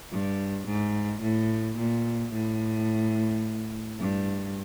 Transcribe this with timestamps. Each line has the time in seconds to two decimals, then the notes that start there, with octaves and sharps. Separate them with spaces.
0.12 G2
0.67 G#2
1.23 A2
1.78 A#2
2.33 A2
3.99 G2